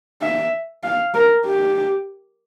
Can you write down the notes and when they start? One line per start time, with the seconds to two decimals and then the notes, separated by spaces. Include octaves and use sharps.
0.22 E5
0.84 F5
1.14 A#4
1.46 G4